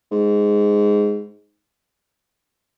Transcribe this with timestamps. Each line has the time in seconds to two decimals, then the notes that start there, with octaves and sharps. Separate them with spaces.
0.12 G#2